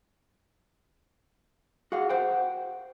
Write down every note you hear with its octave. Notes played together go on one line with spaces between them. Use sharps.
F#4 G#4 F5 F#5
C5 F#5 G5